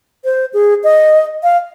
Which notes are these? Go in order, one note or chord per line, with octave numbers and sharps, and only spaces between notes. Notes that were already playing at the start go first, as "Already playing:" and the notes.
C5
G#4
D#5
F5